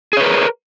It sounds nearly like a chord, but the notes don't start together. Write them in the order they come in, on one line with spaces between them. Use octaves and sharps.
G#4 C#5 B4 A#4